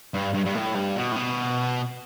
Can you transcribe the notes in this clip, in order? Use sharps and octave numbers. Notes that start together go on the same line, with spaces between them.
G2
G2
G2
A2
G2
B2
A2
B2